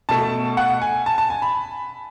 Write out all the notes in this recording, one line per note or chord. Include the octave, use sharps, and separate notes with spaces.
B2 A3 A5
F#5
G#5
A5
A5
G#5
B5